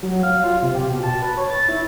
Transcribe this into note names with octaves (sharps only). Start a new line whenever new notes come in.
F#3
F5
F4
C3
G4
B2
A5
B4
C#5
A6
E4